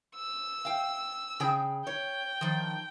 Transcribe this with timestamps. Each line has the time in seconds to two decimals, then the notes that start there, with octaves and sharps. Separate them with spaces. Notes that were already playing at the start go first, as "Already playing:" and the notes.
0.16 E6
0.65 F5 G5
1.40 C#3 G#4 G5
1.87 C#5 G5
2.41 D#3 F3